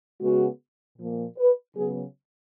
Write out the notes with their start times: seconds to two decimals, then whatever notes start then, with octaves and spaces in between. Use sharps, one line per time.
0.21 C#3 G#3 B3 F#4
0.98 A#2 F3 A#3
1.38 B4
1.76 C#3 F#3 B3 G#4